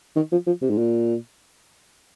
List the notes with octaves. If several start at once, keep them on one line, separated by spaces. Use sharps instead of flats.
D#3
F3
F3
C3
G#2
A#2